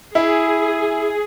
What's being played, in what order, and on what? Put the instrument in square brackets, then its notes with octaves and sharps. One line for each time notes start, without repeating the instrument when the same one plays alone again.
[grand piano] E4 [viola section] G#4